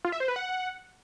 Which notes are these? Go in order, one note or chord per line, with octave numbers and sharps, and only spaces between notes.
F4
E5
C5
B4
F#5